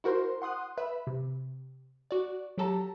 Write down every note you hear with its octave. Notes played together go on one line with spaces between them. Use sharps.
E4 F#4 A#4 C5 C6
F#5 C6 D#6 F#6
B4 E5 B5
C3
F#4 D5
F#3 G4 A4 A5 A#5